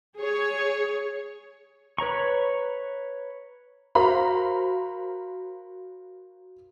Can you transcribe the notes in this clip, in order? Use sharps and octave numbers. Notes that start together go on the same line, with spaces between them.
G#4 C#5
B4 C#5 A#5 C#6
F#4 A#4 C5 F5 A#5 B5